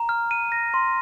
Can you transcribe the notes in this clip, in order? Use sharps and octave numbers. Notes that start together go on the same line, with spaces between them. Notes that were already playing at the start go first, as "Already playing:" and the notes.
Already playing: A#5
F6
D#7
A#6
C6